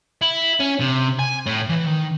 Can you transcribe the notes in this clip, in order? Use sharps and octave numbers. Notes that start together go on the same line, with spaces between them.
E4
C#4
C3
G#5
A2
E3
D#3